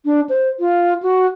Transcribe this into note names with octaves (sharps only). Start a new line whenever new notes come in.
D4
C5
F4
F#4